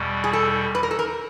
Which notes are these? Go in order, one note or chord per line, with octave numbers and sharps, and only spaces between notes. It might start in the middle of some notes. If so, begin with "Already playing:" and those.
Already playing: E2 B2 G3
G#4
A4
B4
A#4
A4
A#4